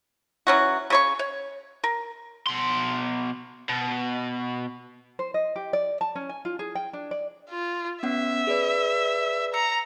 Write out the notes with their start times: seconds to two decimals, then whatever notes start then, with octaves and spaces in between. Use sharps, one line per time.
0.47 E3 F#3 C#4 F#4
0.90 C#3 C#5 C#6
1.19 C#5
1.84 A#4
2.47 B2 C6
3.69 B2
5.19 C5
5.34 D#5
5.56 G4
5.73 D5
6.01 A5
6.15 C#4
6.29 G#5
6.45 F4
6.59 G#4
6.75 G5
6.93 D4
7.11 D5
7.50 F4
8.03 B3 C#4 E5 F#5
8.47 G#4 B4 D5
9.54 A#5 E6 C#7